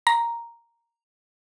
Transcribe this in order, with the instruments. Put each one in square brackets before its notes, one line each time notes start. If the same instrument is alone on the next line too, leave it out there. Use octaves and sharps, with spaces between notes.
[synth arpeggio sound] A#5